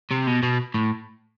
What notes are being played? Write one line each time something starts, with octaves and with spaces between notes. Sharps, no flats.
C3
B2
B2
A2